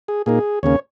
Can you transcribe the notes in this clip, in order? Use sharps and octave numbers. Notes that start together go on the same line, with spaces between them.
G#4
A#2 A#3 D#4 G#4
D#2 C#3 A#3 C#4 C#5